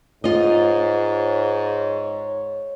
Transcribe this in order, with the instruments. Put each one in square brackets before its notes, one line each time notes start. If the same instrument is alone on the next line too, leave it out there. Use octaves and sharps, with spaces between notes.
[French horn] G#2 [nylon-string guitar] F4 D#5 [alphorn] C#5